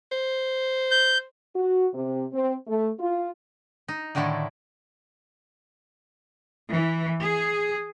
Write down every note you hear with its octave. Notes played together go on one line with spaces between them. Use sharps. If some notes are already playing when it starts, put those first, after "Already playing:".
C5
G6
F#4
C3
C4
A3
F4
D#4
A2 D3 D#3 A3 E4
E3
G#4